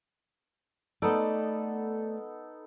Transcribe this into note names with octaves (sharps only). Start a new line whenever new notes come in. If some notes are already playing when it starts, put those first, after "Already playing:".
A3 B3 D#4 A4 D5